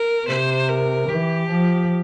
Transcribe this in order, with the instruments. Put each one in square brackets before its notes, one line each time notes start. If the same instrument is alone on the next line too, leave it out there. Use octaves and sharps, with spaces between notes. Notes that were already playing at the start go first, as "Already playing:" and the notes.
Already playing: [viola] A#4
[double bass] C3 [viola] C5
[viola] A#4
[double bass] E3 [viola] G4
[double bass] F3